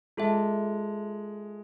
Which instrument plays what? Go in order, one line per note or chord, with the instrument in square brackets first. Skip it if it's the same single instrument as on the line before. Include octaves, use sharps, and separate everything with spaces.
[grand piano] G#3 [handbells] F4 A4 E5 A5